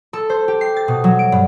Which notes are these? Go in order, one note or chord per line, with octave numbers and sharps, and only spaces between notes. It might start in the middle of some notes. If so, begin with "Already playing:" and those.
A4
C5
G4
C7
A6
B2
F#3
D7
G2